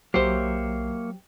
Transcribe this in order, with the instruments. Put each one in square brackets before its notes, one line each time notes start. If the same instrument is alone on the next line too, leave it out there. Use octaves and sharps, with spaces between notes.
[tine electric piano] B1 C7 [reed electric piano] F#3 [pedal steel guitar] A#3 C#5 E5 [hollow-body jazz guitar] G4 C5